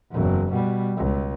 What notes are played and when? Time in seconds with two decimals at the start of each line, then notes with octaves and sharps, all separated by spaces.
0.11 F#1 E2
0.51 B2 G3
0.97 C#2